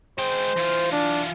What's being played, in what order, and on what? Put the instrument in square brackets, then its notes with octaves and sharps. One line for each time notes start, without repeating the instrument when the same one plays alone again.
[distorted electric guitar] G#3 G5 [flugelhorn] C5
[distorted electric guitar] E3 F4
[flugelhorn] D4